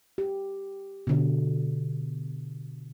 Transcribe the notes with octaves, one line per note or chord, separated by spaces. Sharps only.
G4
B2 D3